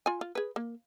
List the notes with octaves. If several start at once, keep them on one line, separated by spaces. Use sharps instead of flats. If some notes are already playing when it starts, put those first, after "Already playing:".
F4 G#5
F4
G#4 B4
A#3